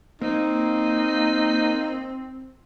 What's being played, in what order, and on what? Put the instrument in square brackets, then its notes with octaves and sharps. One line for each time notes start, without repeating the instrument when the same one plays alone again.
[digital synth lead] A#3 [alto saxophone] C4 [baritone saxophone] D#4